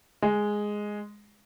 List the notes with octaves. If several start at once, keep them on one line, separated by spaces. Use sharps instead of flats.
G#3